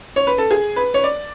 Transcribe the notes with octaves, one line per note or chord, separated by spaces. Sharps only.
C#5
B4
A4
G#4
B4
C#5
D5